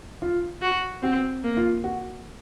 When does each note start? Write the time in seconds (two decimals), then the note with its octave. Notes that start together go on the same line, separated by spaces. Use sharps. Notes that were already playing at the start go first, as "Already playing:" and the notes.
0.22 F4
0.62 F#4
1.02 C4 F#4
1.44 A#3
1.57 F4
1.84 F#4